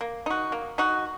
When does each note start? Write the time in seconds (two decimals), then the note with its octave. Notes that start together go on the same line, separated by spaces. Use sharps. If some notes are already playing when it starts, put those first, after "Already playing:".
0.01 A#3
0.26 D#4 F#4
0.52 A#3
0.78 D#4 F#4